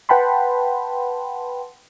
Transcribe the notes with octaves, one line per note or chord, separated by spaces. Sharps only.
B4 F#5 G5 A5 B5 C6